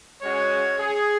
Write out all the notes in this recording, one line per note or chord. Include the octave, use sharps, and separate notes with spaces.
G#3 C#4 F#4 C#5
G#4